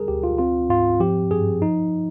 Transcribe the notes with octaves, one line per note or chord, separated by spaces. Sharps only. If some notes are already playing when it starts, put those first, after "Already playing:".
Already playing: G3 G#4 A#4
D2 G4
F4
C4 F4
G#2 F4
F3 G4
G2 G#4
F3 D#4